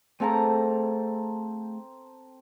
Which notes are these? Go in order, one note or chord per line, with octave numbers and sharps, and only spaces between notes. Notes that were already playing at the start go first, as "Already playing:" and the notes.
A3 C4 G#4 A4 F5 A#5